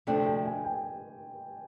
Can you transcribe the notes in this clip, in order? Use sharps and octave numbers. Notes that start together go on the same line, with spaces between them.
D2 C3 F3 A3 D4 G5
G5
G#5
G5